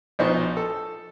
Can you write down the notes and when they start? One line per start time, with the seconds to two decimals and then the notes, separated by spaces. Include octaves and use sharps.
0.19 A#1 B2 F3 D#4 C5 C#6
0.57 A4